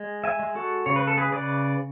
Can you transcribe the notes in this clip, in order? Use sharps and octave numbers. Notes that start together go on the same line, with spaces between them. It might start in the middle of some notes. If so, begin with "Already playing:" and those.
Already playing: G#3
E5 G#5
G#3
F#4 A4
C#3 C#5
B4
A4
G#4 B4
C#3 B4 D5